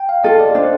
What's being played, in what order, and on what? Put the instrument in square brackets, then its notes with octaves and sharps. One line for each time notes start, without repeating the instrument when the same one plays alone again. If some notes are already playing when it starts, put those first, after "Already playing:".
Already playing: [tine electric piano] G5
F5
[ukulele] F4 A4 [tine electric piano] D#5
[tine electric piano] D5
[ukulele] D4 [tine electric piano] C5